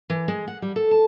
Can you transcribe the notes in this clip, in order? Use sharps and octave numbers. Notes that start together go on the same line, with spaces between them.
E3
G#3
F#5
G3
A4
A5